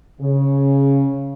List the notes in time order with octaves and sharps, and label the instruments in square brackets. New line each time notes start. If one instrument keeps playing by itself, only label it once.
[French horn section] C#3